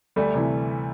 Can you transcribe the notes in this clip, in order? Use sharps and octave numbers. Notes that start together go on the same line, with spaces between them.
D2 G3 A3
C3 E3